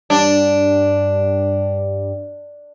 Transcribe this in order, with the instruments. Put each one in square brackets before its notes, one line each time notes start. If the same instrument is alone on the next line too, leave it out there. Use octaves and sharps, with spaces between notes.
[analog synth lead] G2 [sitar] D4